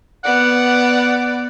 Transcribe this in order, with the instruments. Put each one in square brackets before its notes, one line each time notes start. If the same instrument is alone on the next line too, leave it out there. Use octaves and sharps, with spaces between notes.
[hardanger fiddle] B3 D5 [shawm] F#5